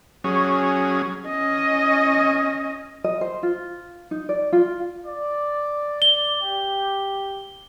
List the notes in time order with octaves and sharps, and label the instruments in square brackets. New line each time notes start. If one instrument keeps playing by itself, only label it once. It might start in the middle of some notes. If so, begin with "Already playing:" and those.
[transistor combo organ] F#3 C#4 G#4
[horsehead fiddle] C#4 D#5
[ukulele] D#5
C5
F4
D#4
D5
F4
[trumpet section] D5
[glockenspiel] G7
[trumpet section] G4